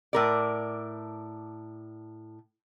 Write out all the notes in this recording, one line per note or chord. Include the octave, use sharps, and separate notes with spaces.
A2 A#4 D5